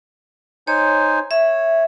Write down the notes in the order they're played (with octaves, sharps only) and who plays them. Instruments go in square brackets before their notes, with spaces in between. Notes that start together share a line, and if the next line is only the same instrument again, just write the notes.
[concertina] D#4 C5 G#5 [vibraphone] C#5
[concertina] C#5 [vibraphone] E5